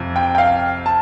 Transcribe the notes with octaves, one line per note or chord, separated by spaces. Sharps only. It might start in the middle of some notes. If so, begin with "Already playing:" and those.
Already playing: F2 C3
G5
G5
F5
A5